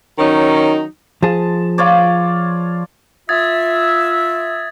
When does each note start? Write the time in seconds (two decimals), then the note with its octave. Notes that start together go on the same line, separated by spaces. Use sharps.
0.19 D#3 F#3 C#4 D#4
1.23 F3 G#4 A5
1.78 F4 C#5 D5
3.29 F4 E5 D#6 G#6 A6